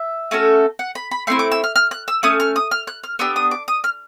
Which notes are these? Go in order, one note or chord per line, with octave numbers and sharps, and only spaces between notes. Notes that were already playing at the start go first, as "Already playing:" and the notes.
Already playing: E5
A3 C#4 F#4 A4
F#5
B5
B5
A3 C4 E4 C6
D6
E6
F6
F6
F#6
E6
A3 C#4 D#6
F6
D#6
F6
F#6
F6
B3 D4 G4 E6
D#6
D6
D#6
F6